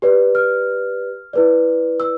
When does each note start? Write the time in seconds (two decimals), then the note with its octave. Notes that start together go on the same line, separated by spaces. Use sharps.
0.02 G4 B4 D5
0.35 F6
1.33 E4 B4 D5
2.00 E6